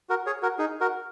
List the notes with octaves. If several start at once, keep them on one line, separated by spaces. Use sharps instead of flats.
F#4 A#4
G#4 C#5
F#4 A#4
D#4 G#4
F#4 A#4